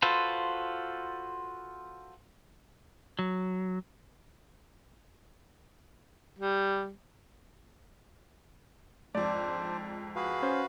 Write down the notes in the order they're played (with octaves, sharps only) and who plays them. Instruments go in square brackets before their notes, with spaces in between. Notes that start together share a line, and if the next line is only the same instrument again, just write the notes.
[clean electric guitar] F4 F#4 A4 B4 C5
F#3
[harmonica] G3
[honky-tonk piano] F2 G#2 [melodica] D4 C5 [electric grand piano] D5
[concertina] F#4 B4 F5 [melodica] G#4
[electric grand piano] C#4 C5